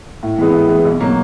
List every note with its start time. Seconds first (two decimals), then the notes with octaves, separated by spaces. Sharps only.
0.23 A2
0.38 E3 G#3 B3
0.54 A2
0.69 E3 G#3 B3
0.85 B1
1.01 B2 F#3 A#3